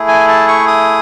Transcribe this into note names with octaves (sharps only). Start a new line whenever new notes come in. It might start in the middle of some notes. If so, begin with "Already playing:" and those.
Already playing: A3 E4 G#4
G#5
A5
C#6
D#6